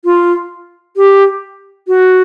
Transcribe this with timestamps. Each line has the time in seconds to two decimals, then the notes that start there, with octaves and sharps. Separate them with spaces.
0.05 F4
0.96 G4
1.88 F#4